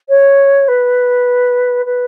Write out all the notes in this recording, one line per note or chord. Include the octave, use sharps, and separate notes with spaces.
C#5
B4
B4